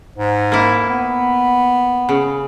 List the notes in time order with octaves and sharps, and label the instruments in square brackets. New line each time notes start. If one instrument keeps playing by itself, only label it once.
[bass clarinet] G#2
[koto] A#3 E4
[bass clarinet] B3
[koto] C#3